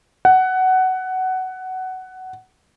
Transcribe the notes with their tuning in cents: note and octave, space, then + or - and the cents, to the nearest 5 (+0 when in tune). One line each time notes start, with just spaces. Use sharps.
F#5 +15